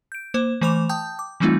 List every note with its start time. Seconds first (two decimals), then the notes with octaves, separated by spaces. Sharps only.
0.12 G6 D7
0.34 A#3 C5
0.61 E3 A3 C5 B5 D6 F7
0.89 G5 A5 D#6 G6
1.19 D6
1.40 E3 G3 A3 C4 D#4 F4